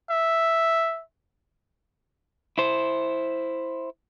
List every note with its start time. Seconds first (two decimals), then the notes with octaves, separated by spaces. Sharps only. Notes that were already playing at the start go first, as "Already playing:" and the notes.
0.10 E5
2.58 E4 C5